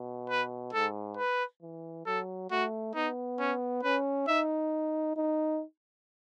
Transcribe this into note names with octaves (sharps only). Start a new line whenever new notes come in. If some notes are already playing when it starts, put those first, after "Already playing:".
Already playing: B2
B4
G#2 A4
B4
E3
F#3 A4
A3 F#4
B3 D#4
C#4
C#4 B4
D#4 E5
D#4